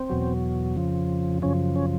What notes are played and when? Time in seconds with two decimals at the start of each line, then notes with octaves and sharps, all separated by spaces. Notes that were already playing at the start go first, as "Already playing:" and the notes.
Already playing: C4
0.10 E2 B2 F#3
0.76 F2 C#3 F3
1.42 F#2 C#3 F3 C#4
1.76 C#4